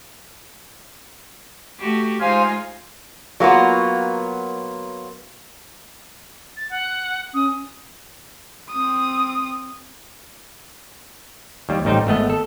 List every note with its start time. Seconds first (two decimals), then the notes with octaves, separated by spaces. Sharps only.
1.79 A3 F#4 G4
2.20 G#3 D#4 F4 C5 F5 G#5
3.40 F#3 A#3 B3 F4
6.57 A6
6.70 F#5
7.34 C#4 D#6
8.70 C4 D#6
11.69 D#2 G3
11.85 A1 G3 D#4 C5 G5
12.07 G#1 A3 B3 D#5
12.30 A4